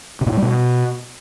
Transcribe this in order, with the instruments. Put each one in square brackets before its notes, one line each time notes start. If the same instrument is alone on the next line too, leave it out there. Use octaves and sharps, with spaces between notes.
[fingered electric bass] C3
A#2
A2
G3
B2